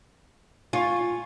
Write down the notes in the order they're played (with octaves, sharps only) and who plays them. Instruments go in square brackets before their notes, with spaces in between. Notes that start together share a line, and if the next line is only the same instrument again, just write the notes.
[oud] F4 [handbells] G#5 C#6